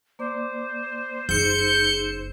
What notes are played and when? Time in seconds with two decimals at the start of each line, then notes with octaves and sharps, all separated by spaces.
0.19 A#3 C5 D5 D6
1.29 F#1 D#4 G#4 E6 G6 C#7